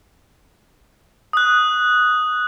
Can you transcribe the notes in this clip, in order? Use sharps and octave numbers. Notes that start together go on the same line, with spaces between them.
D#6 F#6